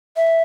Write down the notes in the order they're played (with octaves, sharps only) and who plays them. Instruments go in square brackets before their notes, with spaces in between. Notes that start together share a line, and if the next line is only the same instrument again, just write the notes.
[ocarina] E5